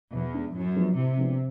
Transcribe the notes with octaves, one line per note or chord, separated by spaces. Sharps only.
E2 B2
G#3 B3 D4
F#2 A2
F3 G#3 B3 D4
A2 C3
F3 G#3 B3 D4